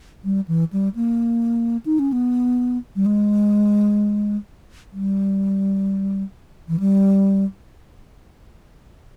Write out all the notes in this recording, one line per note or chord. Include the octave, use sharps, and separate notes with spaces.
G3
E3
G3
A#3
D#4
C#4
B3
G3
G#3
G3
E3
G3